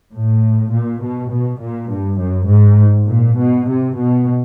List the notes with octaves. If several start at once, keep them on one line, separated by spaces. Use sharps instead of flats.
A2
A#2
B2
B2
A#2
G2
F#2
G#2
A#2
B2
C3
B2